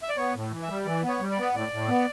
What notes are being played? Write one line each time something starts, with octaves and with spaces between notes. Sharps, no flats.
E5
D5
B3 C#5
A2
E3
E5
G3
E3 D5
B3
C#5
G3
D5
B3
A2 D5
A2
B3